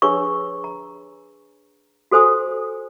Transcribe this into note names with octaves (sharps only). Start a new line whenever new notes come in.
D4 G#4 B4 C#5 C#6
A#5
F#4 A4 C5 G#5 D#6